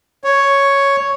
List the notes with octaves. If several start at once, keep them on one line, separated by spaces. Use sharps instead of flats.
C#5